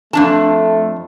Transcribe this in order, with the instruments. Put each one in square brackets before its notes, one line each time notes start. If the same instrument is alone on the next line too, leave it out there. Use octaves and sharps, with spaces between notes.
[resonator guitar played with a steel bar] F2 D4 A5 [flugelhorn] A3